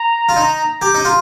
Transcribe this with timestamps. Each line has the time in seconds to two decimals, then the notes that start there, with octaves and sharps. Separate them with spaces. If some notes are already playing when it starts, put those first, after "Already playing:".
Already playing: A#5
0.29 F4
0.36 D#4
0.82 G4
0.95 D#4
1.05 F4